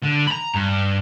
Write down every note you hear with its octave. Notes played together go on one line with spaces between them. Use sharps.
D3
A#5 B5
G2